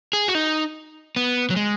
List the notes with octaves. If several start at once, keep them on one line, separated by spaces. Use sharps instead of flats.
G#4
F#4
D#4
B3
F#3
G#3